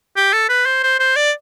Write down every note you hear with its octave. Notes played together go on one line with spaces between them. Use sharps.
G4
A4
B4
C5
C5
C5
D5